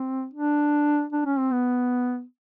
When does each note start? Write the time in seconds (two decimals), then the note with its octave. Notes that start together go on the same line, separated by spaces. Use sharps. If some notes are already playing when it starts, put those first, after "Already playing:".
Already playing: C4
0.34 D4
1.13 D4
1.25 C#4
1.39 C4
1.52 B3